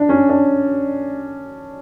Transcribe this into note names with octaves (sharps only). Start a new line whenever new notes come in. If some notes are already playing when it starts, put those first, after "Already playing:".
Already playing: D4
C#4
D4